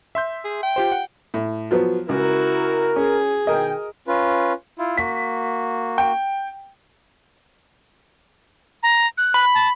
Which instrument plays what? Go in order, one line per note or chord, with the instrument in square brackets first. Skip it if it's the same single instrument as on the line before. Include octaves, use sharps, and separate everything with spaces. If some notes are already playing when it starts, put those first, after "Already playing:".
[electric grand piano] E5 C6 G6
[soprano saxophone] G#4
G5
[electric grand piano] F4 G4 C5
F#5
[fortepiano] A2
F3 F#3 B3
[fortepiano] C#2 [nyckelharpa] E4 F#4 [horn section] A#4
[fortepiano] C#4 [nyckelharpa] G#4
[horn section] B2 D#3 G5 [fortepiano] A#4 D#5
[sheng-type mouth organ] C#4 F4 B4
E4 F4
[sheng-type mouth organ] A#3 F#4 [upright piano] B6
[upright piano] G5
[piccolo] A#5
F#6
[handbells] B5
[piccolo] A5